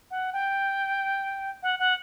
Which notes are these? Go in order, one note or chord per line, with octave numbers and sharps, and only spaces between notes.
F#5
G5
F#5
F#5